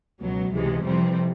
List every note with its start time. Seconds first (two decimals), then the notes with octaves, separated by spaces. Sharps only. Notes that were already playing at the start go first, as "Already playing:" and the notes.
0.20 C#2 B2 F#3
0.52 C#2 C3 E3 G#3
0.84 F2 C3 E3 G3 C4